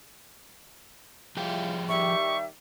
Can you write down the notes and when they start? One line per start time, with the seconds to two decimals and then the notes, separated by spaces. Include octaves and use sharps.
1.37 E3 F3 G3 F4 G#4 G5
1.89 D#3 G3 G4 E5 C#6